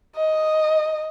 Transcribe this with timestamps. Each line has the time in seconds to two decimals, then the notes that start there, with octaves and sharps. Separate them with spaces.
0.16 D#5